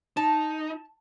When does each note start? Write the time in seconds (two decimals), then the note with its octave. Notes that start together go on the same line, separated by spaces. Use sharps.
0.17 D#4 A5